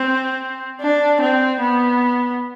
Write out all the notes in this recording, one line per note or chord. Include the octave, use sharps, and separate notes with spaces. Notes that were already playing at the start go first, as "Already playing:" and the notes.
Already playing: C4
D4
C4
B3